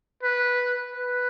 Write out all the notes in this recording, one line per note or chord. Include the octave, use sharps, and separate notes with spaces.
B4
B4